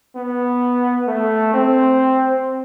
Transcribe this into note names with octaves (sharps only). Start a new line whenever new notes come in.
B3
A3
C4